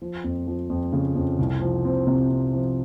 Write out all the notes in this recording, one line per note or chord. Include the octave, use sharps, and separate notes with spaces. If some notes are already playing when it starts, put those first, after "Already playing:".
F3
F2
F3
F2
C#3
F2
C2
F3
C4
C3
C4
F3